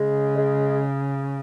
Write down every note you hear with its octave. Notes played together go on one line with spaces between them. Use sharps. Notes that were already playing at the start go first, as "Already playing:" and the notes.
Already playing: C#3 G#3
G#3